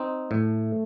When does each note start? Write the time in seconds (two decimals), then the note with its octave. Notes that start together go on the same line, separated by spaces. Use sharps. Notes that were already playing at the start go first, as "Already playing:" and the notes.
Already playing: C4 D#4
0.31 A2 A3